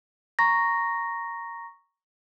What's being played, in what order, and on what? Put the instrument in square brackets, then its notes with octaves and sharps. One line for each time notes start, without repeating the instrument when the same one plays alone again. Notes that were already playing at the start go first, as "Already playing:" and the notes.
[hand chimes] A#5 C#6 A#6